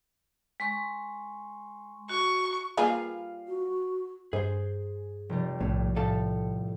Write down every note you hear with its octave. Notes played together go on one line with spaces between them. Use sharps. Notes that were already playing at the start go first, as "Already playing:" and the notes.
G#3 C6 C#6
F#4 C#6
G3 A#3 F4 G#4 B4 F5
F#4
G2 G#4 C5
F1 G3
B1 A2
A2 A4 F5 A5